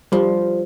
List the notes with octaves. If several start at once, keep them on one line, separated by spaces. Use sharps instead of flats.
F3 G3